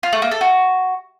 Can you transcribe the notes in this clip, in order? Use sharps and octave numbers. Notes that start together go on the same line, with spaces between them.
F4
A3
A#3
A4
F#4